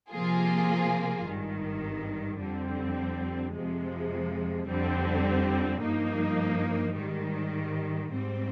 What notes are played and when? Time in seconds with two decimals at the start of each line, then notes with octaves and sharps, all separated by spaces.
0.11 C3 F3 A#3 F4 G#4
1.26 G#1 G2 D#3
2.39 F2 D3 G3 C4
3.53 F2 C3 F3 G#3
4.67 F2 D3 G3 C4
5.81 G2 F3 A#3 D#4
6.96 G#2 D#3 G3
8.10 G#2 G3 C4